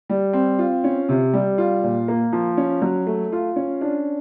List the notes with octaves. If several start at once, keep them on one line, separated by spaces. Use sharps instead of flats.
G3
C4
F4
C#4
C3
G3
F4
A#2
A#3
F3
C#4
F#3
A3
F4
C#4
D4